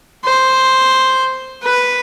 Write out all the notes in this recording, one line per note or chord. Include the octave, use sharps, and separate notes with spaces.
C5
B4